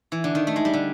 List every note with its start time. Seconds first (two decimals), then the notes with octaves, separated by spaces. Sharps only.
0.12 E3
0.24 D3
0.35 D#3
0.47 A3
0.56 G#3
0.65 G3
0.74 D3